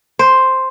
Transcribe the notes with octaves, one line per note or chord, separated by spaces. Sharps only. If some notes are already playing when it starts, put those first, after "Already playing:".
C5